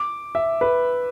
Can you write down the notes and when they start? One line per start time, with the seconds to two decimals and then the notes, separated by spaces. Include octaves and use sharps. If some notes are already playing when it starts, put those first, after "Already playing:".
Already playing: D6
0.35 E5
0.61 B4